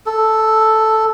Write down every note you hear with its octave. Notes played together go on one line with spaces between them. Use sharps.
A4